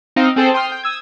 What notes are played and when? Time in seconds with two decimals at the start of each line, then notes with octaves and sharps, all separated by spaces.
0.16 C4 D#4 D#5 F5
0.36 C4 G#4 A4 C5 G5 A5
0.54 G5 C6 D#6 F6
0.69 G5 G6
0.83 D#6 E6 G#6